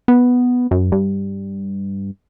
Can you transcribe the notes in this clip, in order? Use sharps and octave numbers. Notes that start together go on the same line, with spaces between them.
B3
F#2
G2